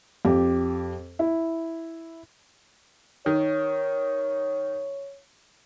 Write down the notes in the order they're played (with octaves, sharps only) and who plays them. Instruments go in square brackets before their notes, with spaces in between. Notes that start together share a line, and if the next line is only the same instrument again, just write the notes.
[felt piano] F2 G4
E4
[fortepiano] D#3 [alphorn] C#5